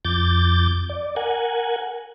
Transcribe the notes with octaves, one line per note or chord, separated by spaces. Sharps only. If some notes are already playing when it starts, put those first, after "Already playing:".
F2 D6 G6 A6
D5
A#4 F#5 G#5